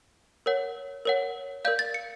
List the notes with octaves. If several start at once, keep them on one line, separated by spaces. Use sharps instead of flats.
A#4 C#5 F#5
A#4 C#5 F#5
A#4 D5 F5 G6
A6
C#7